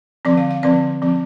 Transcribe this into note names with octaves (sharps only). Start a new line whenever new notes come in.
D3 F3 C4 D5
F5
F5
D3 F3 C4 D5
F3 C4